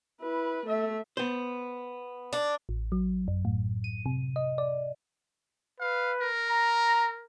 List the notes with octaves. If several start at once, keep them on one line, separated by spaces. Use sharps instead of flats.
E4 B4
A3 E5
B3 C5
D4
A1
F#3
F#2
A2
D#7
C3
D#5
D5
B4 F5
A#4
A#5